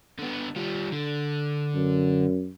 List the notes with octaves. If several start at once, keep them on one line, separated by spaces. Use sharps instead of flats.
D3 B3
G3 F4
D3
F#2